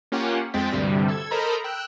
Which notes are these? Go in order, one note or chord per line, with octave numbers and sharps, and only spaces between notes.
A#3 C#4 F4 G4 F#5
F2 G#3 C4 G5 A6 B6
D2 G2 C3 G3
A4 E6 G#6
A4 A#4 C5 D#5 A#5 B5
G5 E6 F#6